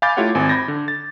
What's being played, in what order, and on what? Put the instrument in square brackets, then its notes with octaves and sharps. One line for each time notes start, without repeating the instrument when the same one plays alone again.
[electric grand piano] F5 G#5 B5 D6 G6 A6
A3 E4 F4 G4 C#5 F#5
G#1 C4 G#5
B5 G6 G#6 A#6
D3
A6